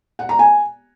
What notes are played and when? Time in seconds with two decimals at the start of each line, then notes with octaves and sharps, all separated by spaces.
0.19 F#5
0.29 A#5
0.39 G#5